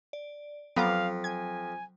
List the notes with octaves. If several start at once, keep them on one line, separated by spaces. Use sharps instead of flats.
D5
F2 F#3 B3 F5 A#5 D6
G#5 G#6